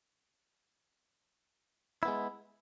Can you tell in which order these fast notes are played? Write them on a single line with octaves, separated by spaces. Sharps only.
E4 B3 G#3